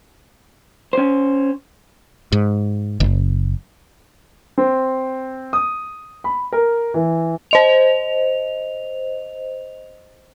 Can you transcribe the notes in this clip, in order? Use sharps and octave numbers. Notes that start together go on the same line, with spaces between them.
C#4 C5
G#2
F#1
C4
D#6
B5
A#4
E3
C5 D#5 F7